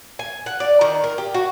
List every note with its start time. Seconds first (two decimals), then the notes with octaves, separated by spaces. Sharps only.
0.19 G#5
0.46 F#5
0.60 D5
0.81 D#3
1.04 A#4
1.18 G4
1.34 F#4